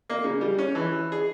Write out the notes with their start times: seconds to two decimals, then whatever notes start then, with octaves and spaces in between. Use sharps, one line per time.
0.10 A#3
0.24 C#3
0.41 G3
0.59 C#4
0.75 E3
1.12 G#4